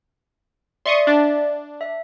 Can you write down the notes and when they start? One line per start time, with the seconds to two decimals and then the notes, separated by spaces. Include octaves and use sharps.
0.86 D5 E5 C6 C#6 D#6
1.07 D4
1.81 E5